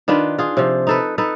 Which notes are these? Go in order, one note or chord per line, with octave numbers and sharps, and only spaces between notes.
D#3 D4 F4 B4
F4 G#4
C3 F3
D#4 A4 B4
D#4 A4 B4